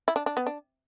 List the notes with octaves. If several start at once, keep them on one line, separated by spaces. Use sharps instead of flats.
E4
D4
D4
B3
D4